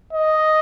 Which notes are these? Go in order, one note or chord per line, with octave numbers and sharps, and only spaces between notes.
D#5